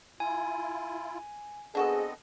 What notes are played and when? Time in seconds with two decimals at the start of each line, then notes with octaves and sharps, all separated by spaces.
0.20 E4 F4 G#5
1.75 B3 C4 D4 F#4 G#4 A4 D#5